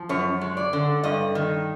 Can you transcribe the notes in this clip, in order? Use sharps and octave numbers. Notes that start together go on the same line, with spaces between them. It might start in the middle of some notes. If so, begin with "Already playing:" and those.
Already playing: F3
F#2 C#5
G#3
D5
D3
G2 D#5
D#3